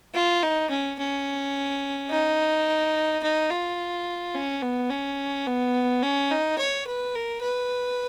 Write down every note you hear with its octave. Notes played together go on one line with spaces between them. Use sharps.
F4
D#4
C#4
C#4
D#4
D#4
F4
C#4
B3
C#4
B3
C#4
D#4
C#5
B4
A#4
B4